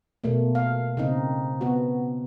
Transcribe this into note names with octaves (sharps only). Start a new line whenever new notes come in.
B2 A3 A#3
F5
C#3 C4 D#4
B3 F#4